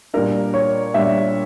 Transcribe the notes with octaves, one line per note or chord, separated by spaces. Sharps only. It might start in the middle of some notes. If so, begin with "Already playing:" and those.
A#2 G3 D4 A#4
C#5
A#2 G3 D4 E5